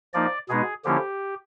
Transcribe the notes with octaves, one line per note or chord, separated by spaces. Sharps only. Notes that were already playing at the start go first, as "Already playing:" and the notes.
F3 A#3 D#4 D5
B2 G#3 B3 D#4 G#4
D3 F3 A#3 C#4 E4 G4